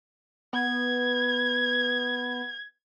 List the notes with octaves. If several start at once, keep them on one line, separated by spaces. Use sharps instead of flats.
B3 G#6